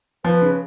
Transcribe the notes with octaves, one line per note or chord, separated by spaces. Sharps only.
F3 B4
C#3